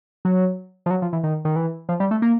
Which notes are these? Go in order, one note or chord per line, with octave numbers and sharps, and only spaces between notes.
F#3
F3
F#3
F3
E3
D#3
D#3
E3
F3
G3
A3
A#3